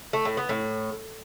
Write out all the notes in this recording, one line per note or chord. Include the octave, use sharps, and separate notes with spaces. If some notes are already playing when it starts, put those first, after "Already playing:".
A3
A2
B3
A2